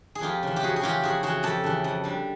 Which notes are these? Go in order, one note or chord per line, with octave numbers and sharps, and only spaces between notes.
G#4
F2 F4 G4
C#3 E3
G4
F2 F#4 G#4
G#4
C#3 E3 F4 G4
F2 F#4 G#4
C#3 E3 F#4 G#4
F2 G4 A4
C#3 E3
F2
D3 G3